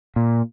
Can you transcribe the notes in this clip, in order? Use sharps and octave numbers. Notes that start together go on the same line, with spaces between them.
A#2